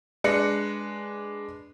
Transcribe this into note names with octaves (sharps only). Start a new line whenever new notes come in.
G#3 D4 B4 F#6 A#6 C#7